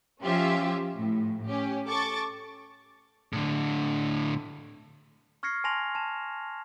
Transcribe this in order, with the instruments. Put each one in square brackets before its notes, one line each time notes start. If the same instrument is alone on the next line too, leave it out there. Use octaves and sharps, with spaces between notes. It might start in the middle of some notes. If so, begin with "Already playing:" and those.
[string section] F3 C#4 F4 G4 E5
A2
C#4 G4
A4 C#6 D6 A6
[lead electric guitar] A2 D3
[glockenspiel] C#6 F6 G#6 A#6 C7 C#7
G#5 A5 C6 A#6 F7
A5 E7